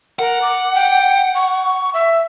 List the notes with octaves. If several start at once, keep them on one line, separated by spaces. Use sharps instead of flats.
A#4 F#5
D6
G5
C#6
E5